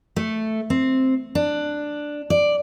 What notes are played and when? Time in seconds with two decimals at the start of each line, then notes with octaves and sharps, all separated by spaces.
0.16 A3
0.70 C4
1.35 D4
2.30 D5